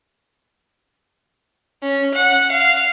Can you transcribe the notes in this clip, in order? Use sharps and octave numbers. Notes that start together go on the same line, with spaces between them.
C#4
F#5
F5